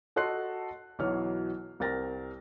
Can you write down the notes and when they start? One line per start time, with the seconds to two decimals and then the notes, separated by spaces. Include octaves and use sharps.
0.16 F#4 A4 D#5 C6 F#6 C7
0.99 B1 E3 F#3 C#5 F6
1.80 C2 C4 A#4 A6 A#6